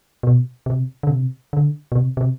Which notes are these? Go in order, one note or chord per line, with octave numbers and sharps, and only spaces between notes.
B2
C3
D3
C3
D3
B2
C3
C3